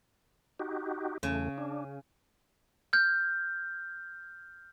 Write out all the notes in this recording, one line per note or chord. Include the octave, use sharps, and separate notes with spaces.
D#4 F#4 G4
E2 C#3 A3
D4
F6 G6